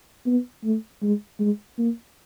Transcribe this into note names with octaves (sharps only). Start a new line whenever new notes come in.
B3
A3
G#3
G#3
A#3